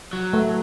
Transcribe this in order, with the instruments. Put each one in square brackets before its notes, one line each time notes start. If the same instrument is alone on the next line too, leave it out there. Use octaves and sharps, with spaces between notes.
[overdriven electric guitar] F#3
[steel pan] A3